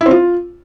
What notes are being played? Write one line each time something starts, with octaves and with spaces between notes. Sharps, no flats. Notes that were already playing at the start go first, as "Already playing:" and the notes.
E4
C4
F4